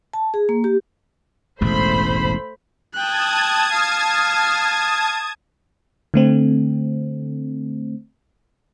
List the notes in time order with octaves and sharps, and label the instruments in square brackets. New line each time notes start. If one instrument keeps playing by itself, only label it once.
[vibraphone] A5
G#4
A#3
G4
[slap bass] E1 A1 G#2 [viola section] A3 C5 B5
[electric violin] G5 F#6 [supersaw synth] A5 D#6 G#6
[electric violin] F5 F6
[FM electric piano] D3 A3 C4